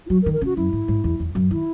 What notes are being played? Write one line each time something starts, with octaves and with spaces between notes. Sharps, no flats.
E4
F#3 F#4
A#4
D#3
A#4
C#3 F#4
F#2 E4
G#2
G#2
E2
E2
F#2
D#3 E4